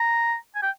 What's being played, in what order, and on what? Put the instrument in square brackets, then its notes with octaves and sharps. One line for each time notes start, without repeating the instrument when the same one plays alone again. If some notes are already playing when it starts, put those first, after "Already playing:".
Already playing: [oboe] A#5
G#5
G5